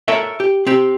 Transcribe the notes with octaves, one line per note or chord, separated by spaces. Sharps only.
A4 A#4 C#5 E5
G4
C4 G4